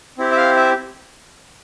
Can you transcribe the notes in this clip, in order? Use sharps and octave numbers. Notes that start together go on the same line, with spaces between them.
C4 E4 G4
E5
F5
E5